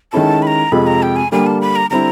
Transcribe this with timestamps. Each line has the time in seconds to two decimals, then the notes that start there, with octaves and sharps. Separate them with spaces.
0.12 D#3 G#3 C#4 E4 A4 A5
0.42 B5
0.47 A#5
0.72 F2 C3 F3 G#3 B5
0.87 A#5
1.03 G5
1.16 G#5
1.32 D3 G3 A#3 G#5
1.46 A5
1.61 B5
1.76 A#5
1.90 D3 G3 C4 E4 A#5